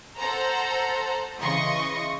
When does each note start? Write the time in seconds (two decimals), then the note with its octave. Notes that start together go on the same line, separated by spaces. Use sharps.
0.18 A4 C5 F#5 A#5
1.39 C#3 E3 D#5 C6 C#6 D#6